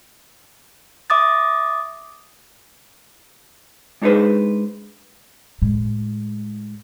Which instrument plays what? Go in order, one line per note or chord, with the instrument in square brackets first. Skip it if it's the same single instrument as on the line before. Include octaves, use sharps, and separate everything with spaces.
[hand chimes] E5 D6 D#6 A6
[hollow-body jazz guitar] G#3 D4 D#4 G#4 B4 C5
[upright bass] A2 G#3